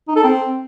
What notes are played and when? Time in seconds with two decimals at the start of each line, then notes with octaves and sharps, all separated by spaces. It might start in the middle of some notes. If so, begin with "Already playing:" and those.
0.08 D#4
0.16 A4
0.24 C4